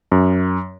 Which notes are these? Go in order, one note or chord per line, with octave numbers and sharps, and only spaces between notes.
F#2